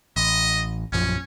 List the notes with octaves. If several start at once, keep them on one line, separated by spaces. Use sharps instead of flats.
A1 D#5
A#1 F#2 F3 C#4